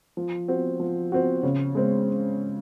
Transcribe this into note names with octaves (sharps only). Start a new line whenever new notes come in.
F3
C4 F#4
F3
C4 F#4
C#3
G#3 C4